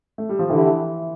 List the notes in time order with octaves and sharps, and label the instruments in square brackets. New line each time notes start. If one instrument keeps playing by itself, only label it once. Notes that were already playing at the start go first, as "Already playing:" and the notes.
[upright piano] A3
G3
F3
[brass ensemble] D3 A3 E4 G4 [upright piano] E3